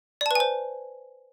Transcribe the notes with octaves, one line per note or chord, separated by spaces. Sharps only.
B4 C5 D5 G#5 A5